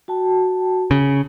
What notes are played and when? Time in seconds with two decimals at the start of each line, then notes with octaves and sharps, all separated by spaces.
0.08 F#4 G5 A5
0.91 C#3